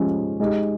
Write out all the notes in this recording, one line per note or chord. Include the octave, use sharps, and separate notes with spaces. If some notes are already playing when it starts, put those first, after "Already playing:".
Already playing: F3 G#3 C#4 G4
G#3 D#4 G4